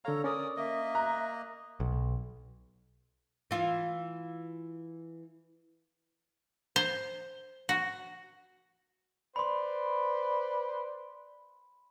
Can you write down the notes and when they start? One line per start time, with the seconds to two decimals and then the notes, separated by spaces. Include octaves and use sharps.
0.05 D3 A4 C#5 F5 A#5
0.24 C#4 A#4 D5 D#6
0.57 A#3 D#5 E5
0.95 A#5 F#6
1.80 B1
3.51 E3 F4
6.76 C5
7.69 F#4
9.36 B4 C5 D5 B5 C6